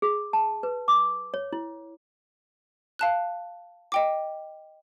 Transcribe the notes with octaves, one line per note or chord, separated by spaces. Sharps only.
G#4
A5
B4
D6
C#5
E4
F5 A5 F#6
D#5 G5 D6